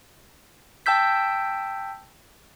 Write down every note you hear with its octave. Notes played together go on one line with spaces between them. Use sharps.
G5 A5 E6 G6 B6